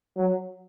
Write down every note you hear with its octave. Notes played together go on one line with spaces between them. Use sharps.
F#3